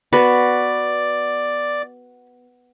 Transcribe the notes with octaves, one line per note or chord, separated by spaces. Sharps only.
B3 F#4 B4 D5